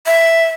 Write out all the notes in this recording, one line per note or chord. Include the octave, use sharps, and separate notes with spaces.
E5